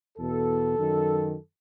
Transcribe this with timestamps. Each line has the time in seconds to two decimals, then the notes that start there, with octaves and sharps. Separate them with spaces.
0.18 E2 B2 A4
0.78 F#2 D#3